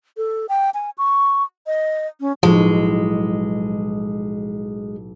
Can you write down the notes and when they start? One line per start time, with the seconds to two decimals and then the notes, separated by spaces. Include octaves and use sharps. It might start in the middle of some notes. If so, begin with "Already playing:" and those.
0.17 A4
0.49 G5
0.74 G#5
0.98 C#6
1.67 D#5
2.20 C#4
2.43 B1 A2 F3 G#3